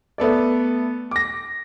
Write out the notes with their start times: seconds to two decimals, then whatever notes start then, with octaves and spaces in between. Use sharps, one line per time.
0.18 A3 B3 A4 D5
1.11 D6 A#6